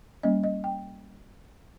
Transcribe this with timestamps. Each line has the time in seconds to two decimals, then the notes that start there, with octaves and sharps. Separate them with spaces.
0.23 G3 A#3 C#4 D#5
0.44 D#5
0.64 G5